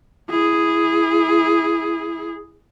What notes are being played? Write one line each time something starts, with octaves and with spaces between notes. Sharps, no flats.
E4 G#4